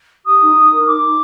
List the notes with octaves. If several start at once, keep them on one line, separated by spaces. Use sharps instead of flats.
G4 D#6
D#4
D#4
A#4
D#6
D#4 D6
D#4